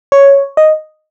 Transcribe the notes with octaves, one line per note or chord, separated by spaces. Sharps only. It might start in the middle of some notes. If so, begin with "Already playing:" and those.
C#5
D#5